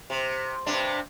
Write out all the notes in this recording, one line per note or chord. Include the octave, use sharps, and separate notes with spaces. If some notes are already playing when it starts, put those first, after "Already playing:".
C3
G2 C3 D4